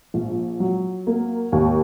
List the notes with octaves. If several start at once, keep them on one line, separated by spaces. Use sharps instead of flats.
A#1
F#3
A#3
D#2